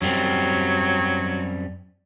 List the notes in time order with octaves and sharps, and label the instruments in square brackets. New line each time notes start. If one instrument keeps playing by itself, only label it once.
[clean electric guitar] F#2 G3 C4 [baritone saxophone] F#3